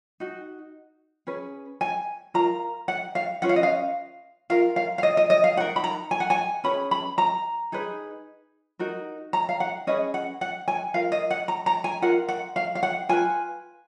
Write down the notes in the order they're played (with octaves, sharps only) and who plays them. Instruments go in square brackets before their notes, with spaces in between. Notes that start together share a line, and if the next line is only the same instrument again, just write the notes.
[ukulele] D#4 F#4
C#4 G#4 B4
G#5
F4 A#4 A#5
F#5
F5
C#4 F4 B4 F#5
F5
D#5
F5
F4 A#4 F5
F5
F5
D#5
D#5
D#5
F5
D#4 F#5
A#4
B5
A#5
G#5
F#5
G#5
C#4 G#4 B4 B5
B5
A#5
D#4 G#4 B4
D#4 F#4 A#4
A#5
F5
F#5
C#4 G#4 B4 D#5
F#5
F#5
G#5
F4 A#4 F5
D#5
F#5
A#5
A#5
G#5
F4 A#4 F#5
F#5
F5
F5
F#5
F4 B4 G#5